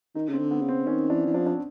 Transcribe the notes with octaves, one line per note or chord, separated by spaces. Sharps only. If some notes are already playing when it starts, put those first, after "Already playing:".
D#3 D#4
C#3 C4
D3
B3
C#3
C4
D#3 C#4
E3 D4
E3
F3 D4
D4